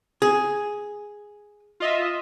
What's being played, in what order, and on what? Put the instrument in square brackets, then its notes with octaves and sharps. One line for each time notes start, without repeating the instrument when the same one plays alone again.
[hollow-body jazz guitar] G#4
[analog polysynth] F4 D#5 E5